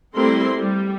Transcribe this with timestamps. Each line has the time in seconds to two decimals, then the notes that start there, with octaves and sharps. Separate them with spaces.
0.14 G3 A3 C4 E4 A#4 C6
0.59 G3